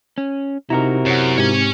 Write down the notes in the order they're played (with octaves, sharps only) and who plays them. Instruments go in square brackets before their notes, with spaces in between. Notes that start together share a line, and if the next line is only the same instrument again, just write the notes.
[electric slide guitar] C#4
[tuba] C3 [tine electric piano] D#4 A#5 [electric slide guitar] E4 F#4 A#4
[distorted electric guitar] F#2 [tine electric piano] C#5 F#5
[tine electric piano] G#2 C4 G4 [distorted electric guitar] C#5 G#5